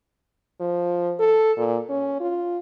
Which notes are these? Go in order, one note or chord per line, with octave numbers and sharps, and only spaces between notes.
F3
A4
A#2
C#4
F4